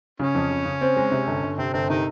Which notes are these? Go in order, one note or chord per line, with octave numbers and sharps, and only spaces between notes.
C#3 C#4
F2
C#3
C#3
C4
G#3
C3
G1
G1
C3 C4
G1 C4
C3 D#3 D#4